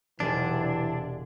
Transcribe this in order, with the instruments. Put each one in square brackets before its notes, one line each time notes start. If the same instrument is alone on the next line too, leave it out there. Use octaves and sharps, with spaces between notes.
[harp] E1 G#4 [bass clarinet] C3 [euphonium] E3 [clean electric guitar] D4